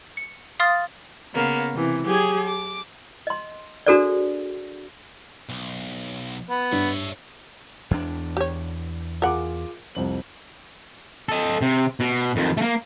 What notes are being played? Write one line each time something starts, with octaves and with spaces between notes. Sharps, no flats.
C#7
F5 C6 D#6 F6 A6
C#3 A#3 B3
C3 E3
F#3 G4 G#4 G#6
D6
D#5 C6
D4 F#4 G#4 A4 C5 D5
B1
B3
G2 C#5 E5
E2 D4
G4 C#5
F4 G#4 A#4 F#5 D6
C2 F2 F#7
A4 D#5
C3
B2
F2 D#3
A3 A#3